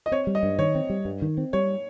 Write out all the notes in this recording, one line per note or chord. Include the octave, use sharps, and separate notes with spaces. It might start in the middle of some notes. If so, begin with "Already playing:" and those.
D#5
C4 C#5
G3
D#5
G2
D#3 C#5
C4
G3
G2
D#3
C4
G3 C#5